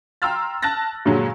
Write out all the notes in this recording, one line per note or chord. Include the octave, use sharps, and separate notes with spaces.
G5 A#5 C6 E6 F6 A6
A5 F6 F#6 A6 A#6
G2 A#2 D3 F#3 G#3 F#4